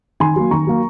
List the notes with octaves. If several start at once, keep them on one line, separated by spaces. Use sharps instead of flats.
D#3 G#5 C6
F#3 A#3
D#3 A#5 C#6
F#3 A#3